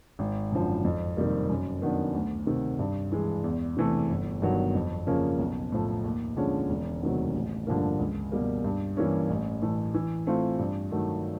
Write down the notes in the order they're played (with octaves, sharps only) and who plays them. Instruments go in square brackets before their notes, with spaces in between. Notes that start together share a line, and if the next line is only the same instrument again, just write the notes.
[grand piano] G#1
F#2 D3 F3
F2
C3 D#3 G3 A#3
F#2
D#3 F#3 B3 D4
D2
C3 D#3
G2
E3 G#3
E2
C3 E3 A3
G1
G2 D#3 F#3 B3
F2
C#3 F3 A#3 C#4
B1
A2 F3 A3
D#2
D3 F3 G#3 C#4
E1
D2 C3 D#3 F#3
A1
G2 D3 F3 A#3
C#2
B2 G3 A#3
G2
E3 G3 A#3 C#4
A1
A2 E3 A3
E3
A3 C4 F4
G2
D#3 F#3 A3